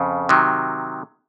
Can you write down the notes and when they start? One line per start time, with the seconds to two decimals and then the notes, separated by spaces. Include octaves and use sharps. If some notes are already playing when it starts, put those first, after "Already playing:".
Already playing: F2 C#3
0.29 C3 D#3 F#3